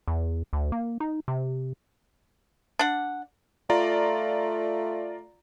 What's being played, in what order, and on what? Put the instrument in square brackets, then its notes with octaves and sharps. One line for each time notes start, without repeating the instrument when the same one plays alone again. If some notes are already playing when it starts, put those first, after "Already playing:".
[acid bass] E2
D2
A#3
D#4
C3
[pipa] D4 F#5
[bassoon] A3 [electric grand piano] F4 D5 A#5